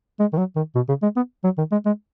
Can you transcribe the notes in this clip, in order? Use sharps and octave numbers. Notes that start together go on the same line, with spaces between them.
G#3
D#3
F#3
D#3
B2
C#3
G#3
B3
F#3
D#3
G#3
G#3